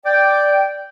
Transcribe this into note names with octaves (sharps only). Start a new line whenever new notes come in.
D5 G5